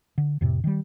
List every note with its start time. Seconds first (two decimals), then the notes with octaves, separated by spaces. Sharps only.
0.18 D3
0.41 F2 A2 C3
0.64 D#3 G3